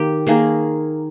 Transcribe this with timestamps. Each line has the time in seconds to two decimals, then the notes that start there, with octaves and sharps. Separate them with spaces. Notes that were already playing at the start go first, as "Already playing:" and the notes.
Already playing: D#3 A#3 G4
0.27 D#3 A#3 G#4